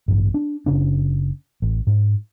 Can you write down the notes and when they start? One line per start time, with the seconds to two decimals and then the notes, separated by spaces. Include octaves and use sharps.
0.08 A1 G2
0.34 D4
0.66 F#1 C#3 D4
1.62 A1
1.87 G#2